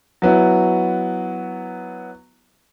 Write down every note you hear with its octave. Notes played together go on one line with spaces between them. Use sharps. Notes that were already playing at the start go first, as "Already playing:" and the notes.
F#3 B3 E4 F#4